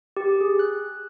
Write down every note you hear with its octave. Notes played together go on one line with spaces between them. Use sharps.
G4
G#4
F#6